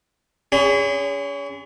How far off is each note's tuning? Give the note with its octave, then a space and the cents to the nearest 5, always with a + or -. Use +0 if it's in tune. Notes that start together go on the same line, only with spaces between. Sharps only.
C#4 +35 G#4 -25 B5 +45